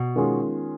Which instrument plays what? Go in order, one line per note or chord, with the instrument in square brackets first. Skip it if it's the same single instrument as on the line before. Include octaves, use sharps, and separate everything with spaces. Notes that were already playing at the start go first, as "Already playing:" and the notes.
Already playing: [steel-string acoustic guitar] B2
[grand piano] D#3 G#3 C#4 F4 G#4